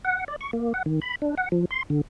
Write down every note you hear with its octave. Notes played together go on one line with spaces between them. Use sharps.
F#5
D5
C#6
A#3
F#5
D#3
B5
D4
F#5
F3
C6
D3